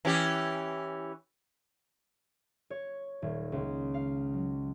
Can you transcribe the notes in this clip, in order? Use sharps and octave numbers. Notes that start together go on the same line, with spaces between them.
E3 C#4 G4
C#5
D#1
C#2
F5
F#3